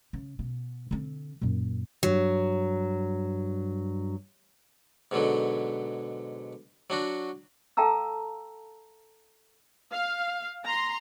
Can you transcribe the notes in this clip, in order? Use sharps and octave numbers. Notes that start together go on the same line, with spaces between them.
C#3
B2
D3 C4
F#2 A#2
G2 F#3
G#2 B2 D3 F#3
F#3 D4 F#4
A4 F5 G5 A5 A#5 E6
F5
A#5 C6